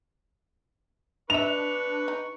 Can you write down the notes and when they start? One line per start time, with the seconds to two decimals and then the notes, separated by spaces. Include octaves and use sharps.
1.30 D4 D#4 B4 E5 C#6 F7
2.08 D#4